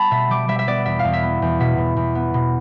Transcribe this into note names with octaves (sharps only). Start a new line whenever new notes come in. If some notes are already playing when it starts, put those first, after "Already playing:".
Already playing: G3 B3 A5 B5
B2 E5
G3 D6
G3 E5
E5
B3 D5
E2 E5
F5
E2
E5
B3
E2
B2 E5
B2
E2
B3
B2